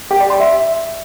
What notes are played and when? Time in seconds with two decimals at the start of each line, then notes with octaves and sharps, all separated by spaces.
0.11 G4
0.20 D5
0.30 C6
0.40 E5